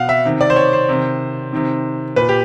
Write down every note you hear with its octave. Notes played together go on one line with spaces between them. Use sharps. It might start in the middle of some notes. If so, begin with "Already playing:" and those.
Already playing: B2 F5 F#5
E5
C3 D#3
D5
C5
C#5
C5
C3 D#3
C3 D#3
A#2 B4
G4